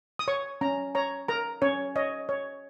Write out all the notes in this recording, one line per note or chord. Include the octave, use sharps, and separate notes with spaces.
D#6
C#5 C#6
C#4 A#5
C#5 A#5
A#4 A#5
C#4 C#5
C#5 D#5
C#5